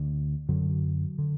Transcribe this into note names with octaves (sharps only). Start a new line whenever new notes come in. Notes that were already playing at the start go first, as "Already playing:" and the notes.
Already playing: D2 D3
F#2 D3 F#3
D3